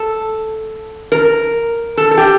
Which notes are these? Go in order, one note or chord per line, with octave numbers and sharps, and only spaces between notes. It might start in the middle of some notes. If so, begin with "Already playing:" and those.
Already playing: A4
A#4
A4
A4
G4